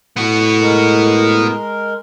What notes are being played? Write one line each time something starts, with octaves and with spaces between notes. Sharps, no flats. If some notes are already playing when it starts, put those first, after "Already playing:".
A2 B3 F#4
G#3 A#4